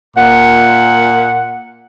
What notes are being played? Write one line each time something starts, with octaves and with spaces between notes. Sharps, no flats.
A#2 F#5